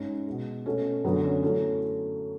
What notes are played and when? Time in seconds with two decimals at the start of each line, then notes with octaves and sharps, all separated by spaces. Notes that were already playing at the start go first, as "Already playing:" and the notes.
Already playing: G#2 G#3 C#4
0.27 B2 G#3
0.66 B2 A3 C#4
1.04 F#2 D3 F#3 A3 B3
1.24 C#4
1.43 A2 F#3 A3 C#4